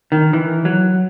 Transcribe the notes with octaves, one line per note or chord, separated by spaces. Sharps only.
D#3
E3
F#3